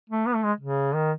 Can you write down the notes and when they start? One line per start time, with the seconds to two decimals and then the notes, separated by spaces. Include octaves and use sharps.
0.10 A3
0.27 B3
0.35 A3
0.44 G#3
0.60 C#3
0.94 D#3